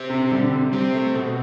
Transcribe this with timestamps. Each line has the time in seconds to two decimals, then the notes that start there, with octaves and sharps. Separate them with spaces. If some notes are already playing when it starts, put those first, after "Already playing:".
Already playing: C4 G4 C5
0.10 C3
0.31 D3 G3
0.53 C3
0.73 C4 G4 C5
0.95 A3
1.15 B2 A3